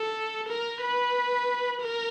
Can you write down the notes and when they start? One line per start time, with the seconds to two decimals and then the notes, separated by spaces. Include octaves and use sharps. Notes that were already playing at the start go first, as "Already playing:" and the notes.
Already playing: A4
0.48 A#4
0.81 B4
1.80 A#4